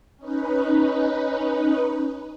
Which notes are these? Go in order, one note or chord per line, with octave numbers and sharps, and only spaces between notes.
C#4 D#4 B4